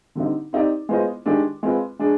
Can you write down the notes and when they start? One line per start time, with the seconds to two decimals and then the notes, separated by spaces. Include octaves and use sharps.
0.15 D3 G3 C4 D#4
0.53 C4 D#4 G4 D5
0.89 G#3 B3 F4 C5 D#5
1.26 D#3 G#3 D4 G4
1.63 G#3 C4 F4 B4
1.99 G#3 D4 G#4